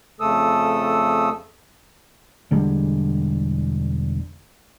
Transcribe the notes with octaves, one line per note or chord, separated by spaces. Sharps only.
F2 C#3 A3 A4 D#6 E6
E1 D3 G3 G#3